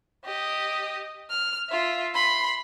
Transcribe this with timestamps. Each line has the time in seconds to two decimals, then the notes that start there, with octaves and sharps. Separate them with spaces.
0.25 G4 D#5
1.30 F6
1.70 F4 E5
2.15 B5 C6